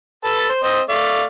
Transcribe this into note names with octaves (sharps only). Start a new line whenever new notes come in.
A4 B4 A5
C5
C4 C5 D#5
A3 D5 F5